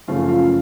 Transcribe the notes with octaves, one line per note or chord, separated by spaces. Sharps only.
F#2 C#3 F3 A3 C#4 F4
F4
F4